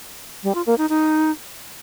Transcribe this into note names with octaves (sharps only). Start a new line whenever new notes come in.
G3
F4
A#3
D#4
D#4